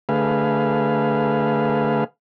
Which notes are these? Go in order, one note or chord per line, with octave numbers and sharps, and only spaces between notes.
D3 A3 G#4 B4 F5